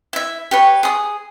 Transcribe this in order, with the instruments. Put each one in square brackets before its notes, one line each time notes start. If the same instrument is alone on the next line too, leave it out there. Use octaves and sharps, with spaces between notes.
[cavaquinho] E4 E5
G4 B4 C#5
G#4 D#6